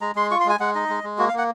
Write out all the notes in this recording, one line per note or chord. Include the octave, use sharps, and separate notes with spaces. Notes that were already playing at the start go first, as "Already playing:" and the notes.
G#3 A#5
G#3 C6
F4 C#6
C6
G#3 G#5
G#3 F#5
D#4 D#5
G#3
G#3
A#3 F#4
F5
A#3 F#5